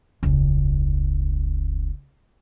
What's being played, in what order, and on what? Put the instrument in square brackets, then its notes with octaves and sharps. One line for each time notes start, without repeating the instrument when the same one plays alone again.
[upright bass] E1 C#2